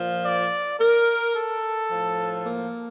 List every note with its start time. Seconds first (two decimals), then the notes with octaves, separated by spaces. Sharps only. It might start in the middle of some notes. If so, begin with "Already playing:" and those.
Already playing: A#2 F3
0.24 D5
0.79 A#4
1.34 A4
1.89 A2 F3
2.45 A#3